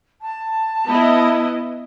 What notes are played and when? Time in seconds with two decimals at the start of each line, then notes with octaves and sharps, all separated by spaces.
0.21 A5
0.87 B3 E4 D#5